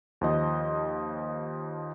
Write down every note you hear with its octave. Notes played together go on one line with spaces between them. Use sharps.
D#2 F3 D#5